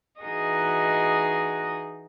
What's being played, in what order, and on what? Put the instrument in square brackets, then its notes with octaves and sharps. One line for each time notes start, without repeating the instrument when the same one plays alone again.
[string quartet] E3 D#4 F#4 G#4 D#5